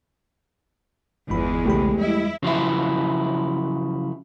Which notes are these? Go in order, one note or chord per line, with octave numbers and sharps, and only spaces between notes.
G1 E2 G#3 B5
B1 C#3 A3 G4 B5
G3 G#3 E4 D#5
C#3 F3 F#3 E4